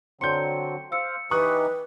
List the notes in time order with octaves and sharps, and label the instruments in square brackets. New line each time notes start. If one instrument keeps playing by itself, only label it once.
[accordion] D3 F#3 C4 [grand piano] C6 G6 [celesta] C#7
[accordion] C5 F5 [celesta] E6 C#7
[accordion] E3 D#4 G4 [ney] B4 [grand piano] C#6 D#6 F#6